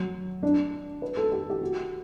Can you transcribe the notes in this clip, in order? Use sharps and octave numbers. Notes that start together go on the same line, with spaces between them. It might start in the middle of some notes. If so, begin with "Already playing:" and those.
Already playing: F#3
D4
B4
A4
G4
G4
F#4